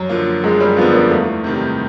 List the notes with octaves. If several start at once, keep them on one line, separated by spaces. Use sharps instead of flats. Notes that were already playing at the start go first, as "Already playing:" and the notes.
Already playing: F#2 F#3
D3 F3 A#3
F#2 G#3
G3
D3 F3 A#3 B3
A#3
E2 A3
C3 D#3 G3